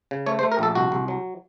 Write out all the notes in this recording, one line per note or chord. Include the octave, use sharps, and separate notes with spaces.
C#3
A3 C#5
C5
A3
A#4
A#1 A4
C2 F#4
C2
F#3